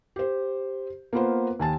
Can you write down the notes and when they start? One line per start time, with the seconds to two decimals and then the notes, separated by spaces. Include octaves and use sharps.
0.16 G4 C5
1.13 A#3 B3 F4 B4 C5
1.59 D#2 G#5 A5